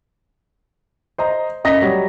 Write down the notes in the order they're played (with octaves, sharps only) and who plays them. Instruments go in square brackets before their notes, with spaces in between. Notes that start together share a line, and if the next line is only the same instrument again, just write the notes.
[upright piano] C5 D#5 A#5
F#2 D#5 A#5 A#6 B6
F#3 G3